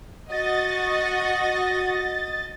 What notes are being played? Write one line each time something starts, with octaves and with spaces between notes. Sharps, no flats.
F#4 D#5 A6